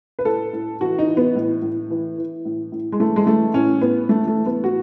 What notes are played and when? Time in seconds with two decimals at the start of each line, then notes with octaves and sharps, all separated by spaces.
0.19 B4
0.25 A2 A4
0.53 A2
0.80 E3 F#4
0.99 D#4
1.08 E3
1.17 B3
1.35 A2
1.62 A2
1.90 E3
2.18 E3
2.45 A2
2.72 A2
2.92 G#3
3.00 E3 A3
3.16 G#3
3.27 E3 A3
3.54 A2 C#4
3.81 A2 B3
4.09 E3 A3
4.27 A3
4.38 E3
4.46 B3
4.64 A2 F#4